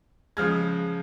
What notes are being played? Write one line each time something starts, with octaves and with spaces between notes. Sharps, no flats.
C#3 F3 G#3 F6 G#6